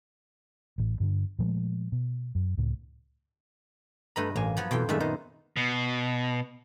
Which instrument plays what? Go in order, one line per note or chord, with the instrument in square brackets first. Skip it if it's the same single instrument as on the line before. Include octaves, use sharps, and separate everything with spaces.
[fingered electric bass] A1 A2
G2 D3 D4
A#2 F3 G#3 A3
B2
F#2
C#2 A2
[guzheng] G2 D#5 B5 [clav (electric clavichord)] A3 B4 A#5
[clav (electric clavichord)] A1 G#5 [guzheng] A#3
[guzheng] F3 F#3 B3
[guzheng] F2 C5 G5 [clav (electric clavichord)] B2 E3
[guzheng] F#2 A#2 E5 [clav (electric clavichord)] D#3 G#3 A3
[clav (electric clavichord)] D#3 B3 D#4 [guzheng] C5
[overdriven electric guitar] B2